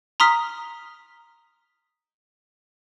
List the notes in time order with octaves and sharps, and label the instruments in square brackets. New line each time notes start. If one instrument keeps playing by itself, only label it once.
[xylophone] A#5 C6 D#6 F6 B6